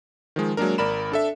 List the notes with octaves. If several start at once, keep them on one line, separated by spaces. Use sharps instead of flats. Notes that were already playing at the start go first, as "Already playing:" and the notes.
D#3 F3 G#3
F#3 G#3 A#3 D4 A#4
G#1 A#4 D5 B5 E7
D4 A4 E5